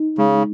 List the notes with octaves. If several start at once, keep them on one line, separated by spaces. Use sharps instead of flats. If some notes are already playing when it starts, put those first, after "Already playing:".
Already playing: D#4
C#3 G#3